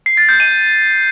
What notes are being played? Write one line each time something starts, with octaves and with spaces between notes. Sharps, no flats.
C7
A6
G6
D#7